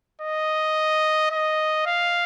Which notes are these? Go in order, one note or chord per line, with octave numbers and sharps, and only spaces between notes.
D#5
D#5
F5